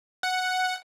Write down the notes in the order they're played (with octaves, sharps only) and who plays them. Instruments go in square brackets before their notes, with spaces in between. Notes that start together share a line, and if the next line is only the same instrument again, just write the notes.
[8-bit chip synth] F#5